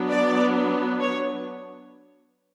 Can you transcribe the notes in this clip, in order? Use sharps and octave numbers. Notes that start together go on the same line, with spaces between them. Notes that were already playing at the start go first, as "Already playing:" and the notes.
Already playing: F#3 B3 D4
D5
C#5